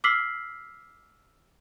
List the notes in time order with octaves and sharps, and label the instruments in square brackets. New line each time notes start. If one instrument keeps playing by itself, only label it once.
[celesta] D6 E6 F6 B6 C7 F#7